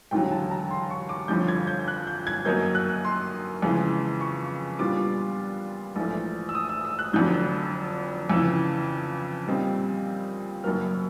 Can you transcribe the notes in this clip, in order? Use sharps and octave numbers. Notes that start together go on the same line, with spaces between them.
E1 D#2 D3 F#3 G5
A5
A#5
C6
C#6
D6
G1 F2 D3 F3 G6
G#6
G6
F#6
G6
G#6
F#2 D#3 F#3 A#3 D#4 G6
F#6
C6
F2 C#3 E3 G#3
C#6
A#2 G3 B3 D4 F4 D6
A#1 G#2 E3 A3
E6
D#6
E6
E6
F#6
F1 F2 D3 F#3 G6
F2 C#3 E3 E6
A#2 G3 C4 D#4
F#1 F#2 D#3 F#3 A#3 F6